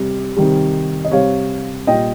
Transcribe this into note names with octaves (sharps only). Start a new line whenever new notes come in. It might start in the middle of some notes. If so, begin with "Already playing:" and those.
Already playing: C3 G3
C3 D#3 G3
D#5
C3 G3 C#5 F5
A#2 G3 D#5 G5